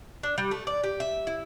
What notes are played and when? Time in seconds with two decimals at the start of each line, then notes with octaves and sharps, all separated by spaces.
0.23 D4
0.38 G3
0.51 A3
0.67 D5
0.84 G4
1.00 E5
1.27 E4